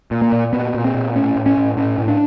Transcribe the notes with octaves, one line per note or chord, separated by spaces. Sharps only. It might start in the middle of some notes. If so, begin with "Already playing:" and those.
A#2
A#3
A#2
A#2 B3
A#2
C4
A#2
A2 C#4
A2
C#4
A2
A2 C#4
A2
D4